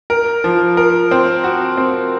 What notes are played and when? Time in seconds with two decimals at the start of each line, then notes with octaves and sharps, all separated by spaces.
0.10 A#4
0.44 F3
0.77 A#4
1.11 C4
1.44 F#4
1.77 C4